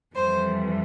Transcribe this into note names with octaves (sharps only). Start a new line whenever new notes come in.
F2 E3 G3 C5